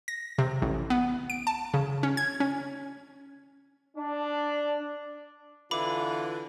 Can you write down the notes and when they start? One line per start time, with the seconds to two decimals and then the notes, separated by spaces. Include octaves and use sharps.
0.08 A#6
0.38 C3
0.62 A1
0.90 B3
1.30 D7
1.47 A5
1.74 C#3
2.03 C#4
2.17 G#6
2.40 C#4
3.97 D4
5.71 D3 E3 F4 B5 D6